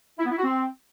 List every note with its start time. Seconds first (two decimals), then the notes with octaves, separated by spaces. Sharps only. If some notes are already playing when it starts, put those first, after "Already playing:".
0.19 E4
0.25 B3
0.31 E4
0.38 F#4
0.44 C4